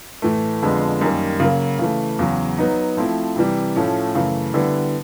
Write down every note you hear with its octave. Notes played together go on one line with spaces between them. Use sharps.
A2 E3 A3
F2 D3 F3 G#3 B3
F#2 D#3 G3 A#3
C#3 F#3 A#3
C#3 E3 A3
E2 C#3 F#3
F#3 B3 D#4
F3 A3 C4 E4
C3 E3 G3
A2 F3 A3 C#4
F#2 C#3 E3 A3
D3 G3 B3 E4